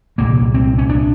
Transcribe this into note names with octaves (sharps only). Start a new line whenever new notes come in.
C2 A#2 A#3
C4
C#4
D4